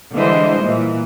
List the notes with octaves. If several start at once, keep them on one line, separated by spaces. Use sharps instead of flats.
D3 E3 G3 G#3 C5 D#5
A#2 E3